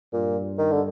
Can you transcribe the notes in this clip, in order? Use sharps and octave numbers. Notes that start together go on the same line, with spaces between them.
G2 A#2
D#3
D3